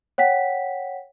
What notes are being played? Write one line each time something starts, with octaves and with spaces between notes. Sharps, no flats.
C#5 F#5 G5 B6